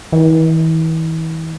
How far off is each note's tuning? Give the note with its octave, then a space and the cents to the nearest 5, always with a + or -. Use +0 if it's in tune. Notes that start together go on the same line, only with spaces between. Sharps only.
E3 -35